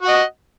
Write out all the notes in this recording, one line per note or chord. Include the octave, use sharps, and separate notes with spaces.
F#4 D#5 F#5